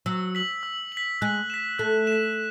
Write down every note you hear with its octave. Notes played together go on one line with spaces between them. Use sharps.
F#3 E6
B6 F#7
E6
F#7
B6
G#3 F#6
B6 E7
A3 F#6
B6 E7